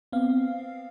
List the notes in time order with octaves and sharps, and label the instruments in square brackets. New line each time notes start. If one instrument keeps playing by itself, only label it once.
[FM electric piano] B3 C4 F5